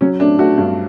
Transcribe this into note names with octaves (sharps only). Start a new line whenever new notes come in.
F#3 C#4
A3 D4
A3 F#4
G2